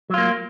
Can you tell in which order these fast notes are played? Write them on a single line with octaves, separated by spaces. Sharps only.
F#3 F4 A#3